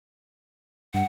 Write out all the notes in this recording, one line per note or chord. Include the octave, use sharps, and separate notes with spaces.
G2 F#5